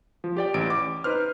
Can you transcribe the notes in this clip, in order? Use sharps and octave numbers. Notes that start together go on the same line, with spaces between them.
F3
G4 D5 G5
A1 D7
D6
D#4 B4 C5 F6